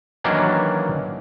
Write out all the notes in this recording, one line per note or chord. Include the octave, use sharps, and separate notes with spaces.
D#3 E3 F#3 A#3 C#4 D4